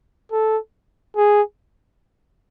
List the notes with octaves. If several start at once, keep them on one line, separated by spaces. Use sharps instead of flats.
A4
G#4